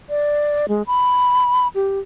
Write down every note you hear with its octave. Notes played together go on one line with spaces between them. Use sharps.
D5
G#3
B5
G4